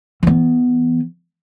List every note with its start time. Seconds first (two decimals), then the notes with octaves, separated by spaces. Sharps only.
0.23 E3 B3